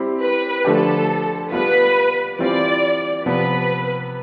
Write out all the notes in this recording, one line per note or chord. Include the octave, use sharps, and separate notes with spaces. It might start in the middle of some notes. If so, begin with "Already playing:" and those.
Already playing: G3 C4 E4 G4
B4
D3 F3 A3 D4 G4 A4
G3 B3 F4 B4
E3 G3 C4 F4 D5
C3 F3 B3 B4